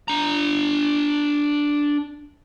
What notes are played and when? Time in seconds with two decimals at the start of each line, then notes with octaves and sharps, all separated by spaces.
0.08 D4 A#5